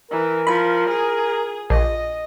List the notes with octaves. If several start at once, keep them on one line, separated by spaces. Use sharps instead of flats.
E3 A#4
F3 B5
G#4
A#1 D#5